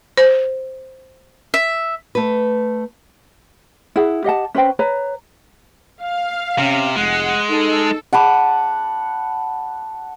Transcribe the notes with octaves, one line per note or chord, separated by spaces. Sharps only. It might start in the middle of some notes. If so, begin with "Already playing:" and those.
C5
E5
A3 B4
E4 G#4 F#5
G4 D#5 F#5 A5
C#4 B4 C5 G5
B4 C#5 A#5
F5
C3 C#4
F1 G#3 F#5
D#4 A4
F#5 A5 B5 D6